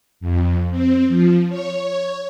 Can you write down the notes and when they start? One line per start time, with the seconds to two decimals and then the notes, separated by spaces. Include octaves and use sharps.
0.20 F2
0.70 C4
1.08 F3
1.49 C#5